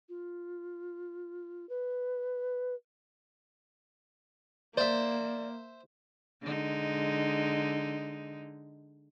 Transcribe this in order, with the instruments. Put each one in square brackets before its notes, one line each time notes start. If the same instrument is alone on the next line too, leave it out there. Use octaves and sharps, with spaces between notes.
[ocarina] F4
B4
[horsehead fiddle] A#3 [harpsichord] C5 E5 [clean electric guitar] D5
[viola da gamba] D3 G#3 D#4